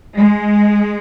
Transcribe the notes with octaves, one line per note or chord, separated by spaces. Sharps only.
G#3